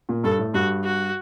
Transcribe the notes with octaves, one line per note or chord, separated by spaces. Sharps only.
A#2
G2 A4
A2
G2 F#4
F#4